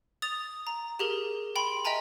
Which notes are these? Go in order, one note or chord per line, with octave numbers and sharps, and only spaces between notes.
D#6 A6 F7
A#5
G4 G#4 A#4
G5 B5 C6
D#5 E5 G5 G#5 A#5